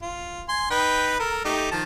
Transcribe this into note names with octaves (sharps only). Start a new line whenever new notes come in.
F4
G#5 C6
D#4 B4 G5
A4 A#4
A3 D#4 G4
D#3 F3 A5